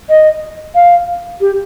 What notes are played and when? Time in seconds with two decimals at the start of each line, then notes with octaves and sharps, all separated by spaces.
0.09 D#5
0.75 F5
1.41 G4